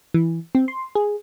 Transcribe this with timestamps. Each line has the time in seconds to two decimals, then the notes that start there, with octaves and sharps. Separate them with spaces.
0.14 E3
0.55 C4
0.68 C6
0.95 G#4